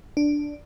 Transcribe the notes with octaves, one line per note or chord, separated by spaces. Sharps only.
D4